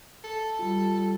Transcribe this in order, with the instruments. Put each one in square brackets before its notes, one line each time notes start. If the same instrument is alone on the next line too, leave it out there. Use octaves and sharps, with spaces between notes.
[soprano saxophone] A4
[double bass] G3 [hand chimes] F4